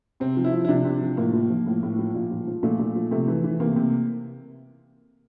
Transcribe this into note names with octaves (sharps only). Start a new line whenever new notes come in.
C3 C4
F3
E4
F3
E4
C3 D4
C3
F3
A2 A#3
F3
F3
A2
A2
F3
A#2
F3
F3
A#2 A3
A#2
F3
C3 A3
E3
E3
C3 A#3
C3